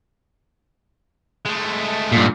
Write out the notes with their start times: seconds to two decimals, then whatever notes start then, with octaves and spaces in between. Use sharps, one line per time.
1.46 G#3 A3
2.12 G2 A#2